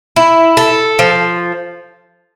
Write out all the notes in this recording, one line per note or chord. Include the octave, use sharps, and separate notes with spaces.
E4
A4
F3